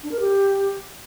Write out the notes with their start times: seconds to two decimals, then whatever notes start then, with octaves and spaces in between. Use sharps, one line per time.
0.03 D4
0.12 A#4
0.20 G4